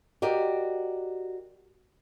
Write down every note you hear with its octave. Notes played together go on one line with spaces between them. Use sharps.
F#4 G4 A#4 D5 D#5